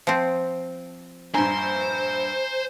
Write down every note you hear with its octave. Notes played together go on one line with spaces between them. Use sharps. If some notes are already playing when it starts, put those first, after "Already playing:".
F3 C4
A#1 G2 C5 G#5 A#5